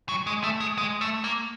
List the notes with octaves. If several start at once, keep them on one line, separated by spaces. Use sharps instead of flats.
F#3
G#3
A3
G#3
G#3
A3
A#3